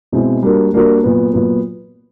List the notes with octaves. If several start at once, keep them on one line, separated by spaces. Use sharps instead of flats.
B2 G#3 C4 E4
G3 A#3 D4 F#4 A#4
G3 A#3 D4 F#4 A#4
A#2 F#3 B3
A#2 F#3 B3